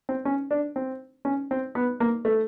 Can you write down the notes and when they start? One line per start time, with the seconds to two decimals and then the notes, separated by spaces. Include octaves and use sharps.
0.09 C4
0.25 C#4
0.51 D4
0.76 C4
1.25 C#4
1.51 C4
1.75 B3
2.00 A#3
2.25 A3